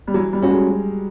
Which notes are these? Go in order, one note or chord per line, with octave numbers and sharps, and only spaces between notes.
G3
E3 F#3
G3
A3 C#4 F#4
G#3